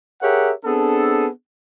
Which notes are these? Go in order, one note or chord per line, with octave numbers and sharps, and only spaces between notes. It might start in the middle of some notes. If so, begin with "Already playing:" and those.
G4 G#4 A#4 C#5 E5 F#5
B3 C4 D4 G#4 A4